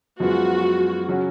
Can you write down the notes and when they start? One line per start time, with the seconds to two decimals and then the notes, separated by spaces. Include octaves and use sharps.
0.20 F#2 F3 G#3 B3 F4 F#4
1.08 C#3 F#3 C#4 F#4